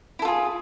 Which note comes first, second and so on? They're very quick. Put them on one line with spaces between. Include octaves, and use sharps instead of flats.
E4 A4 F4 G#4